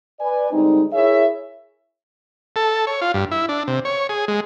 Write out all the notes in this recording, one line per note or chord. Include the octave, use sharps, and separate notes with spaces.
B4 D5 G#5
D3 G3 G#3 C4 D#4
E4 G#4 A#4 C#5 E5
A4
C#5
F4
G2
E4
D4
C3
C#5
G#4
G#3